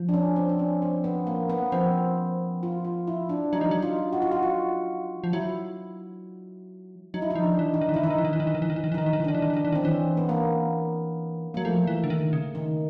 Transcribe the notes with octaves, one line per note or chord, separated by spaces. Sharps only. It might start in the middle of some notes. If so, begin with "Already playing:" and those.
Already playing: F3
D4
C#4
C4
D4
C#4
C4
B3
A#3
B3
F3 C4
F4
F4
E4
D4
F#3 D#4
F3
F#3
F4
F#4
F4
F#4
F4
F3
F#3 E4
F#3 D#4
E4
D#4
F3
D4
E3
D#4
D#3
E3
D#3 E4
E3 D#4
D#3
E3
D#3
E3
D#3
E3
D#3
E3
D#3
E3
D#3
E3
D#3 D#4
E3
D#3
E3
D#3 D4
E3
D#3
E3
D#3 D4
E3
D#3 C4
E3 C#4
B3
A#3
F#3 A#3
F3 A3
E3
D3
D#3
C#3
D#3